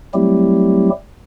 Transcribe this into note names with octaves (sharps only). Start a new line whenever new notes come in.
F#3 G3 A3 C4 E4 G4